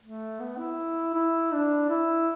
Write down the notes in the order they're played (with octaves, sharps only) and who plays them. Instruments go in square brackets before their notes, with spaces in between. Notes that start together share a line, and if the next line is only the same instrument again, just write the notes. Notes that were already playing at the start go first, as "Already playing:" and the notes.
[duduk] A3
B3
E4
E4
D4
E4